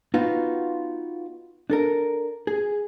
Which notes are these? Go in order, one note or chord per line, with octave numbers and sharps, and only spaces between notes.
B3 D#4 F4 F#4
D4 A4 A#4
G#4